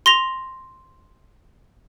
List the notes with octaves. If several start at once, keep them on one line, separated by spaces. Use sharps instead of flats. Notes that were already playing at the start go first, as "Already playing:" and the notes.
C6 A#6 F7